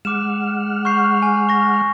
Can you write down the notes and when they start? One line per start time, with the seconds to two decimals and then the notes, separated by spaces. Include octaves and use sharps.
0.05 G#3 F#5 D6 F6 E7
0.85 C#6 G6 C7
1.22 G#5
1.49 C#6 A#6